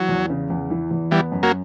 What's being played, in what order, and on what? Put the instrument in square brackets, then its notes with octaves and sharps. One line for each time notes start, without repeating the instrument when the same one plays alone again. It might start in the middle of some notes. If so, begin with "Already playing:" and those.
Already playing: [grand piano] E3 [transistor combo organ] F#3
[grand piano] E2
C#3
E2
E3
E2
[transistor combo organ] E3 G3 [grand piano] B3
[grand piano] F#2
[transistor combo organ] F#3 A#3